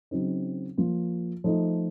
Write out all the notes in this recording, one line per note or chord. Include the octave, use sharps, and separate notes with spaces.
C#3 F#3 C4 D#4
F3 A#3 F4
F3 A3 D#4